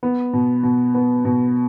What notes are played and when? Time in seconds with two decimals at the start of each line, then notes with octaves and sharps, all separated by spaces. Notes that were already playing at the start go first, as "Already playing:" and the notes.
0.03 B3
0.33 B2
0.63 B2
0.94 B3
1.25 B2